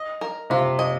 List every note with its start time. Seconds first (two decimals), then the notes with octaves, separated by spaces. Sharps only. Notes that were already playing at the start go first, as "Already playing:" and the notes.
Already playing: D#5
0.21 A#4
0.50 C3 F4
0.79 D#5